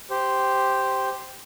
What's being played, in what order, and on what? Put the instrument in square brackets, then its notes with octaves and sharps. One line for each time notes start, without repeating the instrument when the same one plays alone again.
[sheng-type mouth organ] G4 C5